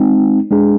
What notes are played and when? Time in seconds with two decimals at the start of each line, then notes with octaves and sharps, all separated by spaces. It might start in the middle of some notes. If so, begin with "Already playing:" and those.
Already playing: G#3 C4 D#4
0.51 G#3 D4 G#4